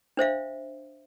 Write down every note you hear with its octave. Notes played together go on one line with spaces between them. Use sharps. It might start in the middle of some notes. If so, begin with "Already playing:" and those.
D4 C5 E5 F5